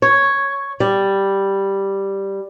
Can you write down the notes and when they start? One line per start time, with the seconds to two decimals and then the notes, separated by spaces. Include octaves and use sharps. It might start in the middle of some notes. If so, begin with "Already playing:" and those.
0.02 C#5
0.80 G3